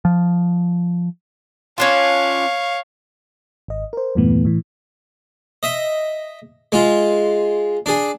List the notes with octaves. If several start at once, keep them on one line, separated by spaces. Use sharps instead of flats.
F3
C#4 D4 F4 C#5 F5
G#1 D#5
A#4 C5
E2 G2 A#2 E3 A3 B3
A2 E3
D#5 E5
G#3 F4
D4 G#4